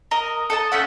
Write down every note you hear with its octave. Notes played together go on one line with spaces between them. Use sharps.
A#4 D#5
A4 D#5 A5
A3 C#4 E5 F#5